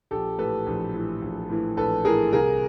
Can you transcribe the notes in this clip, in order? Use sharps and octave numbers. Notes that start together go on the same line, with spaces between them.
A#1 G4 A4
A2 E3 A4 B4
A#1
A2 E3
A#1
A2 E3
A#1 A4 B4
A2 E3 G#4 A#4
C2 G#4 A#4